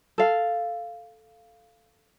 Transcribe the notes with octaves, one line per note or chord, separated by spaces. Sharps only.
A4 F5